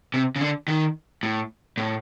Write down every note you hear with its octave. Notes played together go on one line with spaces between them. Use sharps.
C3
C#3
D3
D#3
A2
A2